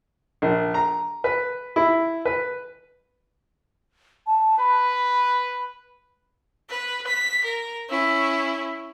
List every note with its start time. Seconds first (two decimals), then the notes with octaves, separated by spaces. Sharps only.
0.42 A#1
0.74 A#5
1.24 B4
1.76 E4
2.25 B4
4.27 A5
4.59 B4 B5
6.69 B4
7.07 B6
7.44 A#4
7.89 C#4 E4